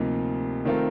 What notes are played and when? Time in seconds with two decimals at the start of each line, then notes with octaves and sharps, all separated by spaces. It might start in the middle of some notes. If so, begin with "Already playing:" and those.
Already playing: D2 C3 F3 A#3 D#4
0.65 D#3 A3 C4 F4 A#4